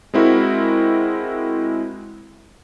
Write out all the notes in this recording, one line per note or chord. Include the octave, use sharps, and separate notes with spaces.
G#3 C4 E4 F#4 A#4